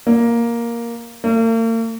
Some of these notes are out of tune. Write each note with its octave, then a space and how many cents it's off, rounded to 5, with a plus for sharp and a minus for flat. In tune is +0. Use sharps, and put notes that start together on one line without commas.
A#3 +5
A#3 -45